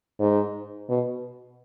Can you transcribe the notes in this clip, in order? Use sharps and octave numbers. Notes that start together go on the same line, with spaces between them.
G#2
B2